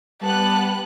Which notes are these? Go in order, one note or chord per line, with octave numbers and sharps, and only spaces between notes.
G3 B3 G4 A5 F#6